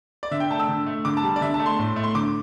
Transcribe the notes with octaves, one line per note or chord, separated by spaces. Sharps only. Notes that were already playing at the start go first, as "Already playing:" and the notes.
D5
D3 E5
G5
A3 A5
E6
D3
A3
D3 D6
A5
G3
D5
D3 E5
A5
A3
C6
A2
A3
C6
D3 D6